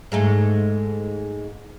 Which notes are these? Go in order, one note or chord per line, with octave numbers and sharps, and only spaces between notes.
G#2 G#3 A3